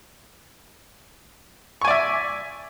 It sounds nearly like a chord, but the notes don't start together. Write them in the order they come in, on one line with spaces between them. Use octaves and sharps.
C#6 G#5 D5 E5